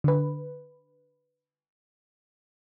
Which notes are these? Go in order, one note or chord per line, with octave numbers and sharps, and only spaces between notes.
D3 B4